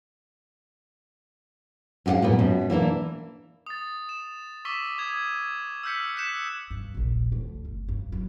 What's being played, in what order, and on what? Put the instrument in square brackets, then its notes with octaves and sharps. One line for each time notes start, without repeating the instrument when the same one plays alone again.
[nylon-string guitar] F#2 F4 G4 F5 F#5
A#2 G3 B3
F#2 B2
E3 A#3 D4 E4
[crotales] D#6 A6
E7
C#6 D6 E6 B6 G7
D#6 G#6 E7
E6 F6 G6 B6 C#7
F#6 G6 B6 C#7 E7
[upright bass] G2
D#1 A#1
D2
G1
G2
F#3